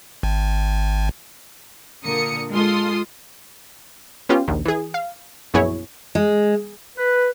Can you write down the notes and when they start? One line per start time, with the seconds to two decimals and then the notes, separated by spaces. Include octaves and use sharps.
0.23 G#1
2.04 A#2 D3 A#4 D#6 C#7
2.52 G#3 F4 A4 C6 D#6
4.29 B3 C#4 F4 G4
4.48 A#1 D#2
4.65 E3 G#4
4.94 F5
5.54 A#1 F#2 B3 E4 G#4 C#5
6.15 G#3
6.97 B4